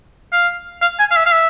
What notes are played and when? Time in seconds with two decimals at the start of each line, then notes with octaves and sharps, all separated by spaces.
0.33 F5
0.82 F5
0.99 G#5
1.11 F5
1.17 E5
1.26 F5
1.33 E5